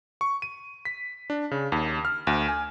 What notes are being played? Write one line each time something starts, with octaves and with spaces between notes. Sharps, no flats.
C#6
D#7
B6
D4
C#3
D#2
F6
D2
G#5